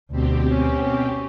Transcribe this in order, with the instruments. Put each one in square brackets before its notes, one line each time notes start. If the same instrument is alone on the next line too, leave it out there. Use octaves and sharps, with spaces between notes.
[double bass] D2 [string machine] B2 C4 G4
[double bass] C#4